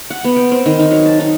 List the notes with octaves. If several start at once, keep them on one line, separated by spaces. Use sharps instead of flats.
F#5
B3
G5
C4
D#3
D#4
F#3
A5
D#4